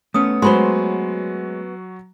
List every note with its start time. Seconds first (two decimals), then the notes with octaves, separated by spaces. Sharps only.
0.14 A3 B3 C#4 D#6
0.42 F#3 G#3 F#4 B4 C5 G5 B5 C6